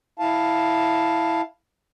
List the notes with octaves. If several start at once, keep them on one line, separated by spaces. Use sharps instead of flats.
E4 F5 A5